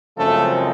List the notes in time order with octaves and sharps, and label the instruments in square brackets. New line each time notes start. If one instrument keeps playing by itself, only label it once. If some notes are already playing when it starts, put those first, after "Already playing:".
[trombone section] F#2 C#3 F3 G#3 A3 C4 A4